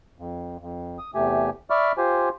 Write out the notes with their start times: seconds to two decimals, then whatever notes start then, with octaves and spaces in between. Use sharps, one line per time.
0.18 F2
0.60 F2
0.98 D#6
1.15 E2 C3 A3 G4 G#5
1.70 D5 E5 B5 C#6 D6 F6
1.98 F4 G4 C5 G#5